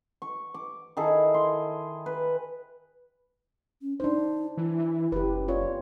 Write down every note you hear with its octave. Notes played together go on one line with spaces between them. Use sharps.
C#6
D6
D#3 E4 G#4 A4
C6
B4
C#4
D4 D#4 C5
E3 E4
F#1 G4 B4
C4 F4 C#5 D5